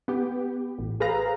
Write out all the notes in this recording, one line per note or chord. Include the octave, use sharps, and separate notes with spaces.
B3 G4
A1
G#4 A4 B4 C5 F5 A#5